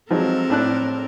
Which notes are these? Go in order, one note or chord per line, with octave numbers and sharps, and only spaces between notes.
F3 F#3 G#3 C4 A4 A#4
A2 D4 F#6